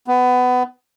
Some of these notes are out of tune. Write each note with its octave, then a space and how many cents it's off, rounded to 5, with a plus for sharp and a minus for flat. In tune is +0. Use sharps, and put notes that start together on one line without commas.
B3 +20